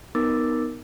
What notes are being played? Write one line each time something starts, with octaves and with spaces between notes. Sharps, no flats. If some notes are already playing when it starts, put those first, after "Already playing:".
B3 D#4 A#4 D6 E6 A6